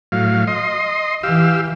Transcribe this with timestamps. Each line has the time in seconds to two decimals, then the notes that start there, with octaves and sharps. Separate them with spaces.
0.12 A2 F#3 F5
0.47 D#5 C6
1.23 E3 G4 F5 E6